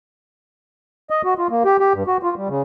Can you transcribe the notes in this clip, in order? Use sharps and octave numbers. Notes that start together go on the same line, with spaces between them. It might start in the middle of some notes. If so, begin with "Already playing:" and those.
D#5
F#4
F4
A#3
G4
G4
G2
F#4
F4
G3
C#3